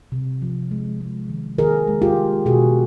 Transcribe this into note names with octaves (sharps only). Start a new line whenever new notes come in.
C3
F3
G#3
G#3
D#3
D#3 G#4 A#4
G#3
F4 G4
G#3
B2 F#4 G#4